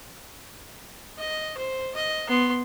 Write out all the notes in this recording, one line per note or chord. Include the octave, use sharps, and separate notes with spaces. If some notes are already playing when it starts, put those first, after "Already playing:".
D#5
C5
D#5
B3 C6